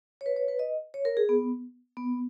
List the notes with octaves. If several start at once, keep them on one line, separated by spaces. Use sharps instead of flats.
C#5
B4
C#5
B4
D#5
C#5
A#4
G#4
B3
B3